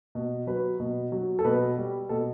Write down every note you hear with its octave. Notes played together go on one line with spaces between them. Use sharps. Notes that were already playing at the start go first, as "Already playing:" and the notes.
B2
F#3 B4
B2
F#3
A4
B2 B4
G3
B2 A4